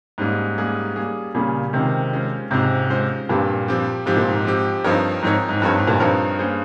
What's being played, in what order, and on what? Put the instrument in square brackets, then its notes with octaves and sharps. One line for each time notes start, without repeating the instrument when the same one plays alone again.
[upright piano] G#2 [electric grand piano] G3 A#3 C#4 G#4
[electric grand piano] G3 A#3 C#4 G#4
G3 A#3 C#4 G#4
[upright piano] A#2 C#3 [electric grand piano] G3 A#3 C#4 G#4
[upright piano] C3 D#3 [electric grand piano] G#3 C#4 F4 C5
[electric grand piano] G#3 C#4 F4 C5
[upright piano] G#2 C3 [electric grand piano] G#3 C#4 F4 C5
[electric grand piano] G#3 C#4 F4 C5
[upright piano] G2 A#2 [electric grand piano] F3 C4 G4
[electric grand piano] F3 C4 G4
[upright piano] G#2 [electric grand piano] F3 C4 G4
[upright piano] A#2
G#2
[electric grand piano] F3 C4 G4
[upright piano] G2 [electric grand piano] F3 C4 D#4 A#4 C#5
[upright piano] G#2 [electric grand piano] F3 C4 D#4 A#4 C#5
[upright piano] G#2
[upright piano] G2 [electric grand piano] F3 C4 D#4 A#4 C#5
[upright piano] G#2
G2 A#2
[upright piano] G2 [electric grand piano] F3 C4 D#4 A#4 C#5
[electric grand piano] A#3 C#4 G#4 C5